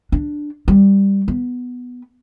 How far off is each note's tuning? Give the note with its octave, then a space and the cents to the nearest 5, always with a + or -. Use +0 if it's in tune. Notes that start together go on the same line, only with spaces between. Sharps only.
D4 +5
G3 +10
B3 +0